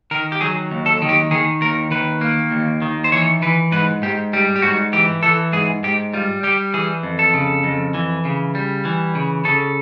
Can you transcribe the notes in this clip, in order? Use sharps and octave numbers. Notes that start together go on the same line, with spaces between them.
D#3 A#4
G4
F#3 G#4
D#2
A4
D#3
G4
D#3 G#4
D#2 A#4
D#3 B4
A#3
D#2
D#3
C5
E3 C#5
E3 B4
G#2 B4
G#2 G4
G3 G4
G4
G#2 F#4
E3 G4
E3 A4
G#2 G#4
G#2 G4
G3 F4
G3 G4
E3 G#4
F2
A4
C#3
F2
E3
C#3
G3
E3
C#3
C#3 A4